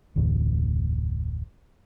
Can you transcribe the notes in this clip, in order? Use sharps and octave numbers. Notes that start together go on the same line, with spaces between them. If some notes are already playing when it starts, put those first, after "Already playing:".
F1 D2 A2 E3